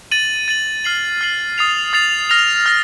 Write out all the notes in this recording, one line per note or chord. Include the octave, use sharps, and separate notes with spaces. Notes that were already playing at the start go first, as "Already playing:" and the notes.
A6 D#7 F#7
A6 D#7 F#7
F6 C7 F#7
F6 C7 F#7
D#6 A6 C7 F7
D#6 A6 C7 F7
F6 A#6 F7
F6 A#6